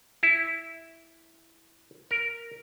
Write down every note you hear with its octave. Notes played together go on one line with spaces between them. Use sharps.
E4
A#4